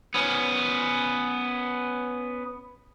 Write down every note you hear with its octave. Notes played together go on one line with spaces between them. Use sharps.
B3 C#4